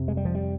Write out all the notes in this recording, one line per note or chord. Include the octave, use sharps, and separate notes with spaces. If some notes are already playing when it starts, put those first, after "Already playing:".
Already playing: F2 C3
G#3
G3
F3
G3